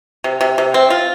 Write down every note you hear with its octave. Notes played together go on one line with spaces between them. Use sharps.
C3
C3
C3
C4
F4